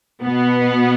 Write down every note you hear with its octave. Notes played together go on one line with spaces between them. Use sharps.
B2 B3